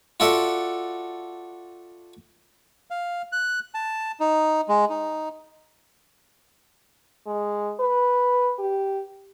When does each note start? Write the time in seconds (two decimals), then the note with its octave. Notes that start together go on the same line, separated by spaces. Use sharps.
0.20 F4 F#4 A4 D5 E5 F#5
2.90 F5
3.32 F#6
3.74 A5
4.20 D#4
4.68 G#3
4.90 D#4
7.26 G#3
7.80 B4
8.59 G4